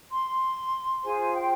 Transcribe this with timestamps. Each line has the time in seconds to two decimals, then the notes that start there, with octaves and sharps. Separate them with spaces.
0.11 C6
1.04 F4 G#4 C5 G#5
1.35 G5